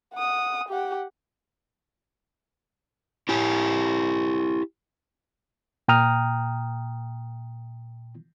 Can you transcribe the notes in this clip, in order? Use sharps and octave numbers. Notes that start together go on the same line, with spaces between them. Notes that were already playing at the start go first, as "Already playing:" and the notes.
F#5 D#6
G4 F#5
E4 G4 G#5
A#2 G5 A#5 D#6 F6